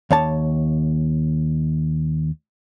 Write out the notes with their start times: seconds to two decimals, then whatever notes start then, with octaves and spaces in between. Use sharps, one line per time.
0.11 D#2 C#5 A5